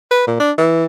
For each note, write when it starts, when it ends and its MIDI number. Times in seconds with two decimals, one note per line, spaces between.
0.11 0.23 71
0.27 0.40 46
0.40 0.52 62
0.58 0.85 52